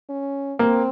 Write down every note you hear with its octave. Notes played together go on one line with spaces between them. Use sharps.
C#4
A#3 C4